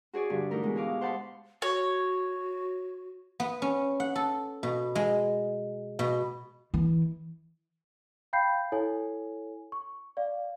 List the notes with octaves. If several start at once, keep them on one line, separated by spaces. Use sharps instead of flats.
F#4 G#4 C#5 D5
G2 D3
E3 A3 D#4 E4 A#4
B2 E3 G#3
C#5 D#5 F5 D6
C5 F#5 A5 B5 C6
F#4 C#5
B3
C#4
F#5
A4
B2
G#3
B2
E3
F5 G5 B5 G6 C7
E4 A4 C#5 G#5
C#6
D5 F5